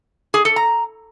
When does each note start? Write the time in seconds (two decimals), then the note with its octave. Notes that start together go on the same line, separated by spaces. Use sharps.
0.34 G#4
0.45 A4
0.56 A#5